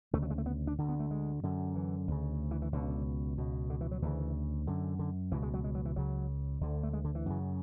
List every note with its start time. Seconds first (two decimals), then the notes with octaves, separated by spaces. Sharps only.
0.13 D2 C#3 A3
0.22 F#3
0.30 G#3
0.38 A3
0.46 B3
0.67 D4
0.78 D2 D3
0.89 B3
1.00 A3
1.11 G#3
1.43 F#2 D3
1.75 E3
2.08 D2 C#3
2.51 E3
2.62 E3
2.72 C#2 B2 D3
3.38 C#2 B2
3.70 D3
3.81 E3
3.91 F#3
4.02 D2 C#3 E3
4.67 F#2 D3
4.99 D3
5.32 C#2 B2 E3
5.43 G#3
5.54 F#3
5.64 G#3
5.75 F#3
5.85 E3
5.96 C#2 C#3 F#3
6.61 D2 D3
6.83 A3
6.93 G#3
7.05 D3
7.15 E3
7.26 F#2 C#3